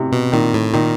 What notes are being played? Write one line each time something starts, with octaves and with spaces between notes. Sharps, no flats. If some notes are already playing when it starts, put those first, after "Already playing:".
Already playing: C3
B2
A#2 D#3
A2
A#2 D#3